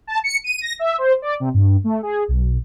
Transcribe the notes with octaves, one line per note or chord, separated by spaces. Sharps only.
A5
C#7
D#7
A#6
E5
C5
D5
C3
G2
A3
G#4
B1